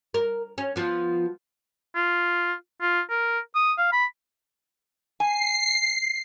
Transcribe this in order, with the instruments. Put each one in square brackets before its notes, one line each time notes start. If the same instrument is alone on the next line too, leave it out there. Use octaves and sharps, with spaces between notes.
[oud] A#4
C#4
F3 B3
[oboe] F4
F4
A#4
D#6
F5
B5
[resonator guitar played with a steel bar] G#5 [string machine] C7